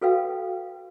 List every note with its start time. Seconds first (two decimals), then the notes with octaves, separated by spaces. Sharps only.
0.01 F#4 A4 B4 F5 G5